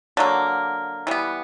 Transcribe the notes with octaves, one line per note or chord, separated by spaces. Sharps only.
D3 F#3 A#3
E3 G3 B3